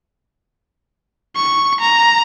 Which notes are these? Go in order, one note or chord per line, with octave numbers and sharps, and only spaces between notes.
C#6
A#5